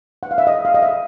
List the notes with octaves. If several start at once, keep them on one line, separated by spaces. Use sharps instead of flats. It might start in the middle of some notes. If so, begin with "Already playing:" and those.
F#5
F5
E5
D#5
F5
D#5
E5